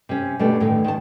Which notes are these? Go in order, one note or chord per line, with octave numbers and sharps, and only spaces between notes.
C3 C#4
B2 A3 D4 G4
A2 D3 D#3
D#3 A5